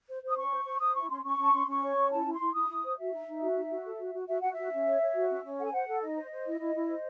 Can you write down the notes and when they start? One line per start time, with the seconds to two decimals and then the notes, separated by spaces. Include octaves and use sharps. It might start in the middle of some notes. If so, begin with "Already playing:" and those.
0.09 C5
0.23 C5
0.29 D#6
0.37 C#4 C#6
0.52 C5
0.66 C5
0.80 C5 D#6
0.96 E4 C#6
1.09 C#4 C6
1.24 C#4 C#6
1.39 C#4 A5
1.53 C#4 C6
1.67 C#4 C#6
1.82 C#5
1.97 C#4
2.11 E4 A5
2.25 E4
2.33 C6
2.40 E4
2.54 E4 D#6
2.69 E4
2.83 C5
2.98 F#4 E5
3.13 D#4
3.27 D#4
3.41 F#4
3.56 D#4
3.71 F#4
3.84 A4
3.99 F#4
4.14 F#4
4.28 F#4 E5
4.40 F#4 F#5
4.53 F#4 E5
4.71 C#4
4.86 C#5
5.01 C#5
5.15 F#4
5.30 C#4
5.44 C#4
5.59 A4 F#5
5.66 G#5
5.73 C5 F#5
5.88 A4
6.02 D#4 D#5
6.17 C5
6.31 C5
6.45 E4
6.60 E4
6.75 E4
6.89 C5